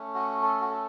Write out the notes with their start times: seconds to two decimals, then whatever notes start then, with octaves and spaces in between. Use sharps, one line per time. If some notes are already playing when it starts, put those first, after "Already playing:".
Already playing: A3 C#4
0.15 F#4
0.42 A4
0.61 F#4
0.70 A4